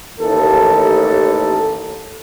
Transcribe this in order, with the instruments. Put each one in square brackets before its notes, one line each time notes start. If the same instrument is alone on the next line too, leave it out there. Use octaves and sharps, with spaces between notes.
[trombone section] A1 D#2 A3 A4